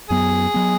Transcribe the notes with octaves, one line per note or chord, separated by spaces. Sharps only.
F#2 F#3 B3 G#4
F#3 B3